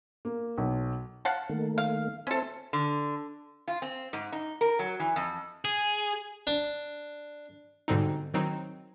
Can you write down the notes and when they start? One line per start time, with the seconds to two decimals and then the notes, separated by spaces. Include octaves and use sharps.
0.25 A#3
0.58 B1
1.25 F5 F#5 A5
1.49 D#3 A3 A#3
1.78 F5
2.27 C4 C#4 A4 C5 E5
2.73 D3
3.68 F4
3.82 C4
4.13 G#2
4.32 D#4
4.61 A#4
4.79 F#3
5.00 E3
5.16 F2
5.65 G#4
6.47 D4
7.88 G#2 B2 D3 G3 C4 D#4
8.34 D#3 F#3 C4 D#4